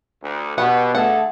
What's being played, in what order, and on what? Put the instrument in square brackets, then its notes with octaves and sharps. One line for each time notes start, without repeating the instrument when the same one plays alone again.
[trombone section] D2
[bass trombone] B2 [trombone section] B3 G4 [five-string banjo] F#5
[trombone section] D3 G#4 A4 [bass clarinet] A3 [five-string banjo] F#5